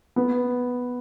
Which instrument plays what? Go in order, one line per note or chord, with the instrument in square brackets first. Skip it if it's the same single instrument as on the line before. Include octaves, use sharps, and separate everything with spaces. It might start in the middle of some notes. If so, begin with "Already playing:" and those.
[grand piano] B3